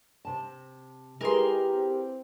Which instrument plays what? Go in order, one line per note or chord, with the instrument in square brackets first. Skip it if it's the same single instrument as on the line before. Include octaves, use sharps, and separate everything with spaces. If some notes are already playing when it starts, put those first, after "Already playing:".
[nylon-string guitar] C3 A5
[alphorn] G#3 [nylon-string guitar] E4 G#4 B4 [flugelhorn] G4 [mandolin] A#4 C6
[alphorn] C4